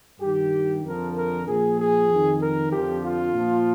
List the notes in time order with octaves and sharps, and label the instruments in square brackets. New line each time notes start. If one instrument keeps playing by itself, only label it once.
[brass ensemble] G2 D#3 G4
F2 D3 F3 A#4
A#4
A#2 F3 G#4
G#4
F2 D#3
A#4
F2 D3 F3 G4
F4
A#2 F3